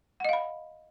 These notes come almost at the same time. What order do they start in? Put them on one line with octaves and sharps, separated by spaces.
F#5 D#5 F5 B5